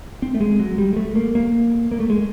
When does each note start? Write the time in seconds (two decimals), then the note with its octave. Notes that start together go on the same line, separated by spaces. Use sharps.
0.22 C4
0.34 A3
0.41 G#3
0.60 F#3
0.78 G3
0.93 G#3
0.96 A3
1.16 A#3
1.35 A#3
1.91 A#3
2.00 A3
2.10 G#3